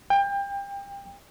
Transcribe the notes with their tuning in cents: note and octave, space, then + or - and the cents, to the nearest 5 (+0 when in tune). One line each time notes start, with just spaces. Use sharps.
G5 +30